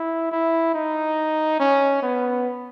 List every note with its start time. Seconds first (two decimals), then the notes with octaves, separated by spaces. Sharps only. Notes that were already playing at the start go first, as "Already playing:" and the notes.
Already playing: E4
0.32 E4
0.74 D#4
1.60 C#4
2.03 B3